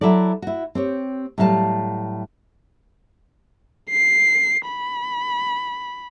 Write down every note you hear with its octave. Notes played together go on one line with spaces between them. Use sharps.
F#3 E4 F#4 A4 D5
E4 F#4
C4 G4 C#5
A2 F#3 G3 F5 A5
C7
B5